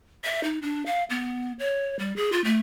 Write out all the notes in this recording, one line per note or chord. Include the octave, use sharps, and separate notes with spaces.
E5
D#4
D4
F5
B3
C#5
G3
G#4
F4
A3